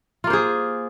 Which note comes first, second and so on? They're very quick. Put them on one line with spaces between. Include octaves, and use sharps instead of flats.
F4 A#3 C5 G#4